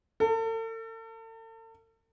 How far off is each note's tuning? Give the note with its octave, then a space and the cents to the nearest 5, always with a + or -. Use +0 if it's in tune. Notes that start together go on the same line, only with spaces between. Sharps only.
A4 +40